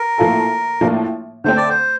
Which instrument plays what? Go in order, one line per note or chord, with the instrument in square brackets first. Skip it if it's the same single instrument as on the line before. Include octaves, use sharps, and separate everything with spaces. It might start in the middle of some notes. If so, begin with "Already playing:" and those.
Already playing: [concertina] A#4
[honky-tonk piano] A2 F3 A#3 F4 A4
A2 F3 A#3 D4
[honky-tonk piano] D3 A3 C4 [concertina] C5
[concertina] D5
C5